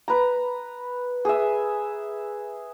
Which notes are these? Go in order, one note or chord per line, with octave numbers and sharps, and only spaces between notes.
B4 A#5
G#4 E5